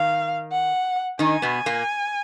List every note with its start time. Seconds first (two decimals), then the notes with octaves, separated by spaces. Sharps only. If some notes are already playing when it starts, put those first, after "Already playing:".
Already playing: D#3 F5
0.52 F#5
1.19 D#3 D#4 G#5
1.42 B2 B3
1.66 A#2 A#3